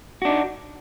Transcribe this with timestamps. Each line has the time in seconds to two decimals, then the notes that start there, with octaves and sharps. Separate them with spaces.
0.22 F#4
0.25 D4
0.29 D#4